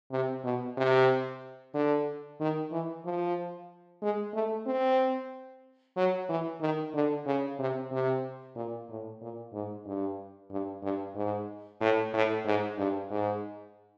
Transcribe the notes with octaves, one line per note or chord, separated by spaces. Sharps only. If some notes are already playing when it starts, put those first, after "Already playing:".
C3
B2
C3
D3
D#3
E3
F3
G#3
A3
C4
F#3
E3
D#3
D3
C#3
C3
C3
A#2
A2
A#2
G#2
G2
G2
G2
G#2
A2
A2
G#2
G2
G#2